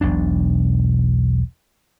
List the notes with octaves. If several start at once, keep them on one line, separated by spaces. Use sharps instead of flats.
E1 B1 B2 D4